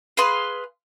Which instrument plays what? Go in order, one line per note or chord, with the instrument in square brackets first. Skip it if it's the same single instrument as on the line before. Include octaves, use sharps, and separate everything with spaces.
[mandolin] G#4 B4 F5 C6